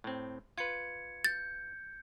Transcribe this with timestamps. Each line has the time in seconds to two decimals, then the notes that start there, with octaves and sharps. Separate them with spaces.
0.04 A2 C4
0.58 F4 B4 G#6 C#7
1.25 G6 A6